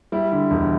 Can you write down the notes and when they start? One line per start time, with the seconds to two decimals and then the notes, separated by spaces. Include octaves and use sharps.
0.12 G3 E4
0.32 D3
0.51 E1